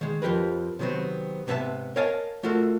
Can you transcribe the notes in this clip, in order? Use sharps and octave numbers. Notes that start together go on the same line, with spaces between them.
D#3 G#3
F2 F3 G4 A#4 B4
C3 D#3 F#3 B3 C4
G#2 C3 B3 C#4 E5 A5
A#4 C#5 D#5 F5 G#5 A5
A3 F4 F#4 A4 A#4